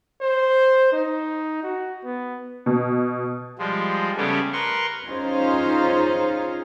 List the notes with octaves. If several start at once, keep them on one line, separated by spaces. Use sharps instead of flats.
C5
D#4
F#4
B3
B2
F3 G3 G#3
C#3 G3 A3 B3 G4 G#4
A#4 B4 C6 C#6
C#4 D#4 F4 G#4 C5 F5